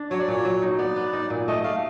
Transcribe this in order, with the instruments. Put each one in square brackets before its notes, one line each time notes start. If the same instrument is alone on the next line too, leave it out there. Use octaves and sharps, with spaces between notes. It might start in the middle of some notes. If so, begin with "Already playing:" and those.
Already playing: [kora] D4
[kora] F#3 [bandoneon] C#5
[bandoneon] D5
[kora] A#2 [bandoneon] C#5
[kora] F#3
D#4
[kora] B3 [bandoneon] D5
[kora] B3
D#4
A#2
[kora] A3 [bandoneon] D#5
[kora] A3 [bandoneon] F5